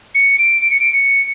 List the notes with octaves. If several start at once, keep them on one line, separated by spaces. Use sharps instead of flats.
C#7
D7
D7
C#7
D7
C#7